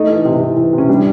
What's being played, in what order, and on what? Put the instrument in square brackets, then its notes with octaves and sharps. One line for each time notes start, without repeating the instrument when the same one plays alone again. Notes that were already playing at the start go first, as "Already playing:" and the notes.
Already playing: [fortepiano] A3 D#4
E3
C3
E3
E3
C3
C#4
G3 D4